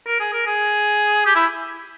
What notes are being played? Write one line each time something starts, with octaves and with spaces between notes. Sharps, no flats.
A#4
G#4
A#4
G#4
G4
E4